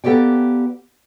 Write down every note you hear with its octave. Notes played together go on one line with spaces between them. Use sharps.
A#3 B3 G4 A4 D5 G5